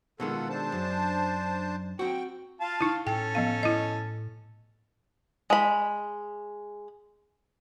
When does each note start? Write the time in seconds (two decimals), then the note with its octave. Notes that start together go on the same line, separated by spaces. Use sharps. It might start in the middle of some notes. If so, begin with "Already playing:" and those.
0.20 B2 D#3 G#3 F4 A4 F#5
0.49 D4 C5 A5
0.72 F#2
1.99 C4 F#4 G5
2.61 F4 F5 A5
2.81 D#4 E4
3.07 A2 C#4 A4 G5
3.35 F3 B3 F5
3.63 E4 D#5
5.50 G#3 B5